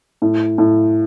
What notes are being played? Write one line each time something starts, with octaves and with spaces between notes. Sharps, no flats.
A2
A2